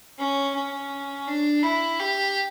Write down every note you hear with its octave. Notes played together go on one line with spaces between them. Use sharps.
C#4
C#4
D4
E4
G4